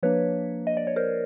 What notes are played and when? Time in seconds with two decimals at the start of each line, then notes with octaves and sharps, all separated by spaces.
0.03 F3 A#3 D4 B4 C#5
0.67 D#5
0.77 D5
0.87 C#5
0.96 A#4 C5